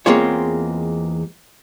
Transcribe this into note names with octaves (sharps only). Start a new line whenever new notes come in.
E2 G#3 A#3 C4 F4 C#5